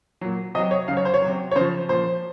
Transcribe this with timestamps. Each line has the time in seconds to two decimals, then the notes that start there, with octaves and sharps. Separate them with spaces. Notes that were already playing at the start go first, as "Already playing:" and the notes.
0.21 A#2 F#3
0.54 C3 D#5
0.58 F#3
0.71 C#5
0.88 C#3 F#3 F5
0.97 C#5
1.05 C5
1.14 C#5
1.22 C3 F#3
1.51 C#5
1.56 C#3 F3 C5
1.88 A#2 F3 C5